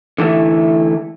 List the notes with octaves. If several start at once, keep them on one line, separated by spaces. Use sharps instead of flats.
D3 E3 A3 E4